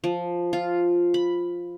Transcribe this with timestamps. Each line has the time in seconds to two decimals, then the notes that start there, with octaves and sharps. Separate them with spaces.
0.04 F3
0.53 F4
1.14 B5